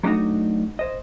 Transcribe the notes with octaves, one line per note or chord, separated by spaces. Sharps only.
F#3 G3 A3 D4 D#4 F#4
C5 D#5